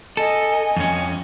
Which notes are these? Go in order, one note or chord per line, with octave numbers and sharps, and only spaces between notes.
A4 D#5 G#5
F2 C#4